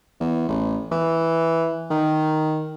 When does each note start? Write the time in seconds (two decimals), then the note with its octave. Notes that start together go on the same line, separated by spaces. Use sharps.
0.20 E2
0.48 A1
0.92 E3
1.90 D#3